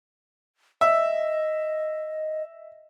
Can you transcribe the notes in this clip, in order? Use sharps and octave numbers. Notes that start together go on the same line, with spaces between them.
D#5 E5